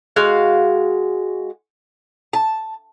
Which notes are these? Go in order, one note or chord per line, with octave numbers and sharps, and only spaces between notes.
G#3 F#4 F5
A5